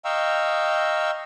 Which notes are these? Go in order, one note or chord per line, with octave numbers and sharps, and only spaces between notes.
D#5 F5 G5 A#5 C#6 E6